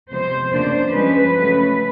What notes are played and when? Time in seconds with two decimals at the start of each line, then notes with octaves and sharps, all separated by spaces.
0.11 C3 F3 G#3 B3 C5
0.52 C#3 F3 A#3 D4 C5
0.93 F3 G#3 C#4 B4
1.35 C#3 F#3 A3 C#4